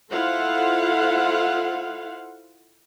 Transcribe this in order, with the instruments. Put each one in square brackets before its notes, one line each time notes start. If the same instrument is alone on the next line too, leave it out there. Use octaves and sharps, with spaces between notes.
[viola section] E4 F4 A4 C5 F5 F#5